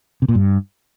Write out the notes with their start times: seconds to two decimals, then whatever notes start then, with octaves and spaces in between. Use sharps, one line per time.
0.22 C3
0.28 A#2
0.35 G2